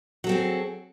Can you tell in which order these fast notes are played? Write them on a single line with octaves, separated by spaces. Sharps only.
F#3 A4 C4 G#4